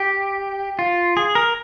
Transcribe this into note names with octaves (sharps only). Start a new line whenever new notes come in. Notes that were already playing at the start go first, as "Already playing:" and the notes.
Already playing: G4
F4
G#4
A#4